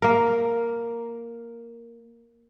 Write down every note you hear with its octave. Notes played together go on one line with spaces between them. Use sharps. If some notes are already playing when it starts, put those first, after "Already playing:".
A#3 A#4